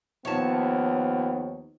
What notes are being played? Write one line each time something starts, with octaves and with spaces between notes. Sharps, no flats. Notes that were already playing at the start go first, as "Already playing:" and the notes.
D#2 F3 B3 C#5 A5